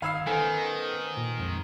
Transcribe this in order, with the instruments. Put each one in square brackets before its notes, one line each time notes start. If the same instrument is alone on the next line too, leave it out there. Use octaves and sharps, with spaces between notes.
[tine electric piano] G1 B5 G#6 [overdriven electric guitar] D#3 [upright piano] F5 E6 C7
[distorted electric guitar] D#3 [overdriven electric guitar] B3 C5 [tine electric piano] A4 [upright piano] G#5
[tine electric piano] A#2
[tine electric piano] A#1 F2 [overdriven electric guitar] G#3 D#4